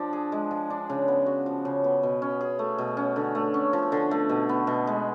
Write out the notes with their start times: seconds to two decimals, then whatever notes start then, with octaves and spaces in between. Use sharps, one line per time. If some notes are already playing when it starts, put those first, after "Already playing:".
Already playing: F3 D4
0.13 G#4
0.32 G#3
0.51 F3
0.70 D4
0.90 C#3
1.08 B3
1.26 F#4
1.46 F3
1.65 C#3
1.84 B3
2.03 B2
2.22 C#4
2.41 G#4
2.59 A3
2.78 B2
2.97 C#4
3.16 D3
3.35 A3
3.54 C#4
3.73 F3
3.92 D3
4.11 A3
4.29 B2
4.49 B3
4.67 B2
4.87 G#3